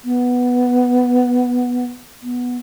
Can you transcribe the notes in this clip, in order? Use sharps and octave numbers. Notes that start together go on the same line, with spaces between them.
B3
B3